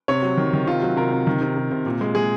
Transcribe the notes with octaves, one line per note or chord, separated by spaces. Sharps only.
C3 C#5
F#3
D#3
D#3
C3 F4
F#3
C3 A#4
C3
D#3
C3
C3
C3
A#2
G#3
G#3 G#4